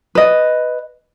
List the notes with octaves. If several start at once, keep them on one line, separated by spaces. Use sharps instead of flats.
B4 D#5